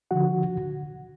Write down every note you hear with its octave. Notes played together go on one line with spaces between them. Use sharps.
D3 F3 F#4 F#5